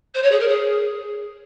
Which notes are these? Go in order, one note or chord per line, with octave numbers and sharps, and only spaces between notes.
C5
C#5
G#4
A#4
G#4